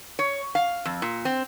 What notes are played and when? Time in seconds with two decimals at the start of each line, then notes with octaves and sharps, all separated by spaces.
0.19 C#5
0.55 F5
0.85 F2
1.02 A#2
1.25 C4